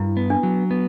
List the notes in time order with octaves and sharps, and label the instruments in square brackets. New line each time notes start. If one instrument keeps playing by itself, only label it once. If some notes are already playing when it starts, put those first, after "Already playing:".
Already playing: [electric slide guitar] G2 [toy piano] E4
[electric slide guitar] B3
[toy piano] D4
[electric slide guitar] F#3
B3